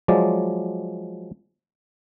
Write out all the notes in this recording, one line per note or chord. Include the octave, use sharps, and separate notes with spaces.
F3 F#3 G#3 D5